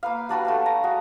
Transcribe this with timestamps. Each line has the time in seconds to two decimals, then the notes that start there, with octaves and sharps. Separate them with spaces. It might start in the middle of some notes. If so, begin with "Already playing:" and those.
0.03 A#3 B4 F5
0.29 G3 D4 F#4 B4
0.45 A3 F5 A5
0.66 A#5
0.84 G#3 F#4